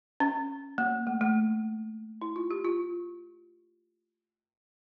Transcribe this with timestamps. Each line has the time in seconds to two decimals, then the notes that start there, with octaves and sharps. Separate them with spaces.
0.20 C#4
0.78 A#3
1.07 A3
1.21 A3
2.22 E4
2.36 F4
2.51 G4
2.65 F4